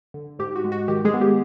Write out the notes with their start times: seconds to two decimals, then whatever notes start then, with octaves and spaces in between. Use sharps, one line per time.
0.14 D3
0.39 G#2 G4
0.56 F#4
0.65 G#3
0.72 F#4
0.88 D#3 G4
1.05 G#3 G#4
1.14 B3
1.21 G4